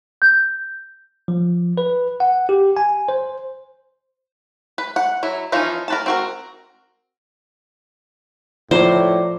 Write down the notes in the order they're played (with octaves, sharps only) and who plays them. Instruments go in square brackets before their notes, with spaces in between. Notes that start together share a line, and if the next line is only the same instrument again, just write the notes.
[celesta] G6
[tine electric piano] F3
B4
F#5
G4
G#5
C5
[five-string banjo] B4
F#5
F#3 E4
E3 F3 C#4 D#4 F4
A#4 B4 A5
C4 F#4 A#4
[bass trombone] A2 [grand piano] F3 [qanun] C5 [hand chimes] D5 A#5